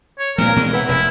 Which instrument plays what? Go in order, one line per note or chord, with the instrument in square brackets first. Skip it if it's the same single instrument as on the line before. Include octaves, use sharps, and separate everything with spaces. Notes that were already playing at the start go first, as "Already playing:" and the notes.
[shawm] C#5
[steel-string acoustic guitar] G2 A#2 C4 [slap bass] F3 A#3 [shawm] A#4
[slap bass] B2 E3 G#3 [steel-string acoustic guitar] C4
[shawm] E4 [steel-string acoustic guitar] B4 F#5
[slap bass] F1 [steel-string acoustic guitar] C3 [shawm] E4